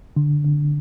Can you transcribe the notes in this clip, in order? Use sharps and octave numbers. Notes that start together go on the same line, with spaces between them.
D3
D3